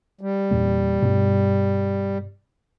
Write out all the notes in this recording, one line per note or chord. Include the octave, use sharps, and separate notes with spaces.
G3
E2 A#2 A#3
G2 B2